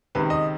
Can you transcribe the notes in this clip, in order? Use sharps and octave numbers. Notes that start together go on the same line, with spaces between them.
C#2 C3 D#3 B4
D#5